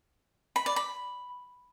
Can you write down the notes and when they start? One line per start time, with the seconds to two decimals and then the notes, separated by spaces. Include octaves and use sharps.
0.56 B5
0.66 D5
0.76 B5